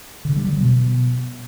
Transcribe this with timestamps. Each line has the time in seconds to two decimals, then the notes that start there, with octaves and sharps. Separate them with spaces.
0.25 D3
0.36 G3
0.48 F#3
0.60 B2